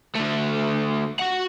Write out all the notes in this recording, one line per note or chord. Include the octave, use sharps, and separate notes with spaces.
D3 A3
F#4 F#5